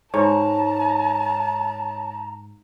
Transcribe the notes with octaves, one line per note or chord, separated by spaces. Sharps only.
G#2 C#5 A5 A#5